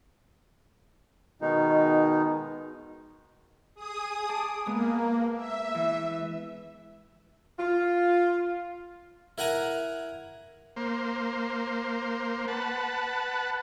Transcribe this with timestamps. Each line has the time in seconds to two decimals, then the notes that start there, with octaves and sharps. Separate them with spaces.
1.41 B2 D#3 G#3 D#4
3.75 G#4 D#6
4.29 A5 D6
4.66 G#3 A#3 B3
5.36 E5
5.74 E3
7.59 F4
9.38 E4 A#4 F#5 G#5 A#5
10.76 A#3 C5
12.48 B4 F#5 A5